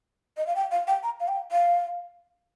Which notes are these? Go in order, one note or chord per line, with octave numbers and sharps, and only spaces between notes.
D#5
F5
G5
F5
G5
A#5
F5
G5
F5